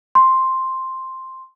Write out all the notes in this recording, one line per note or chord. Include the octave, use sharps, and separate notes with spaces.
C6